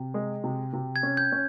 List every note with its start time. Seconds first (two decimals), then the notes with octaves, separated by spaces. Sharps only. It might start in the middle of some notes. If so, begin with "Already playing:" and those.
Already playing: C3
0.14 G#3
0.44 C3
0.73 C3
0.96 G#6
1.03 C#4
1.17 G6
1.32 C#4